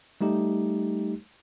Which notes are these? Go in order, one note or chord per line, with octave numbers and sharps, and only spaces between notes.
G3 A3 D#4 G4